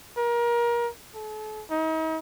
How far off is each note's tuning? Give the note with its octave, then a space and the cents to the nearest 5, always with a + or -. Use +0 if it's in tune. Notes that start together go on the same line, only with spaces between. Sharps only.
A#4 +25
A4 -40
D#4 +40